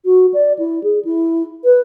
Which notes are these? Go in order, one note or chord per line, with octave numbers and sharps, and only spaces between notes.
F#4
D5
E4
G#4
E4
B4